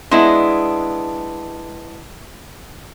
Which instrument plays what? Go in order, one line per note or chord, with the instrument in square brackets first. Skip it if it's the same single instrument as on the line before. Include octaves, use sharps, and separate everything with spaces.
[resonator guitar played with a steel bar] G#3 B3 D4 E4